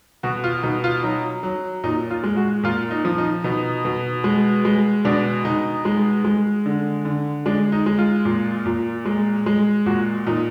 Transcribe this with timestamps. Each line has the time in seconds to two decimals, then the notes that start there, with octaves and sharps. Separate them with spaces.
0.23 B2 F#4
0.44 F4
0.63 B2 D#4
0.84 F4
1.03 F#3 D#4
1.43 F#3
1.84 A#2 D#4
2.10 F4
2.24 G#3
2.37 F#4
2.64 A#2 F4
2.91 D#4
3.05 F3
3.18 D#4
3.44 B2 D#4
3.85 B2
4.24 G#3
4.65 G#3
5.05 B2 D4
5.45 B2 D#4
5.85 G#3
6.25 G#3
6.66 D3
7.05 D3
7.46 G#3 D4
7.72 D#4
7.86 G#3
7.98 F4
8.25 A#2
8.66 A#2
9.05 G#3
9.46 G#3
9.86 A#2 F#4
10.26 A#2 D#4